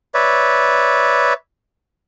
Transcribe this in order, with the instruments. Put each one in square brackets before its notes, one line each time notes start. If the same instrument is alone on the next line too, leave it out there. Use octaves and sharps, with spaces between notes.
[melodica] B4 C#5 D5 E5